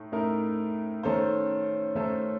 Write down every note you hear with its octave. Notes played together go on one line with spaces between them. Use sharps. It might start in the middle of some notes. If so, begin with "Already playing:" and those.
Already playing: A2 A3 D#4
A2 A3 D#4 A#4
D#3 A3 C#4 A4 C5
D#3 A3 C#4 A4 C5